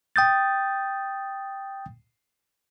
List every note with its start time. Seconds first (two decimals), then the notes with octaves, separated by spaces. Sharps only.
0.16 G5 D#6 G6 A6